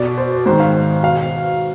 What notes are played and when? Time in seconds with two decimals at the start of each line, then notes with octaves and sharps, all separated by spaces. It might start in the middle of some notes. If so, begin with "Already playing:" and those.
Already playing: B2 D5
0.18 C5
0.32 C5
0.46 G#2 D#3 C5
0.60 F5
1.03 B2 F5